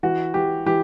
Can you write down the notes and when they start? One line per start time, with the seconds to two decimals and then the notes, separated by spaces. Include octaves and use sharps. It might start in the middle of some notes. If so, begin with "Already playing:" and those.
0.03 E3 F#4
0.34 E3 G4
0.66 E3 G4